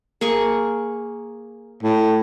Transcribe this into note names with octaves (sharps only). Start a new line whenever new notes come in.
A#3 G#4 C#6
A2